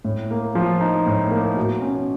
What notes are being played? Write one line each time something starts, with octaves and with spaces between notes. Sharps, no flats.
A2
A#3
F3
D#4
A2
A#3
B2
C#4